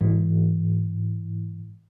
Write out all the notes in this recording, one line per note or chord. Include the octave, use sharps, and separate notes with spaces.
G#2 E3